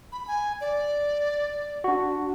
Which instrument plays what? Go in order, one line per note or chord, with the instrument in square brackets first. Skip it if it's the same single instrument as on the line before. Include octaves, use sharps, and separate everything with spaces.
[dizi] B5
G#5
D5
[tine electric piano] D4 F#4